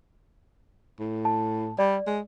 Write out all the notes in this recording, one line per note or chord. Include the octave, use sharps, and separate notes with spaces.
A2
A5
G3 D5
G#3